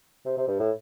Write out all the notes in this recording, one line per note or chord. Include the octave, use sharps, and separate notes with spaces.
C3
C3
G2
A2